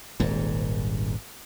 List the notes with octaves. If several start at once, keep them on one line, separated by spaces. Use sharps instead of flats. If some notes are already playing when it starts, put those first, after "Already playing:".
D#1 G#1 G#2